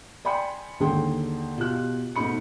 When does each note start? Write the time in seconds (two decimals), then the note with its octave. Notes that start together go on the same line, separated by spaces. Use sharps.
0.25 D5 G5 G#5 B5 C6 C#7
0.80 D#2 D3 D#4 G#4 G5 C6
1.57 B2 F4 G4 F#6
2.16 G#2 B2 A3 D#4 B5 C#7